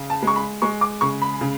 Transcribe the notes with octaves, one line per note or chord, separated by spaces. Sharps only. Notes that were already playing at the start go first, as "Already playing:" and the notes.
Already playing: C#3
A5
G#3 C#6
B5
G#3 C#6
D6
C#3 C#6
B5
C#3